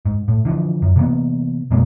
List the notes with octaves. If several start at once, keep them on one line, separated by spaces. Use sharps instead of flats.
G#2
A2
D3 E3 F3
F#2
C3 E3 A#3 B3
F#2 B2 G#3 A#3